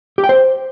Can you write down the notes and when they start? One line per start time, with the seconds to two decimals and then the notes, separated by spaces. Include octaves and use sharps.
0.18 G4
0.24 G5
0.29 C5